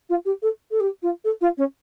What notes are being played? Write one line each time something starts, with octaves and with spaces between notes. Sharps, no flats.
F4
G4
A4
A4
G4
F4
A4
F4
C#4